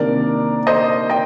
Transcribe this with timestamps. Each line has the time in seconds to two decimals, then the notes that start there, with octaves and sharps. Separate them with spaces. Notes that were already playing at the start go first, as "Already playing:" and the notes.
Already playing: C3 D#3 A#3 D4 A#4 D5
0.67 C5 D#5
1.10 D#5 G5